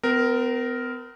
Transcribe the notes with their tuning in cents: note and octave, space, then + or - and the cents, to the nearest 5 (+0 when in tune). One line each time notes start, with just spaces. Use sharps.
B3 +45 A#4 -5